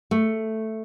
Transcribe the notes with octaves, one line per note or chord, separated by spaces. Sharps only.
A3